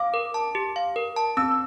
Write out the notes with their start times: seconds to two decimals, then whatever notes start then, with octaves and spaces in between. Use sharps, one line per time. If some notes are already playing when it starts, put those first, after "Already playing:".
Already playing: F5 D6
0.14 A#4
0.34 A5
0.55 G4
0.76 F5
0.96 A#4
1.16 A5
1.37 C4 E6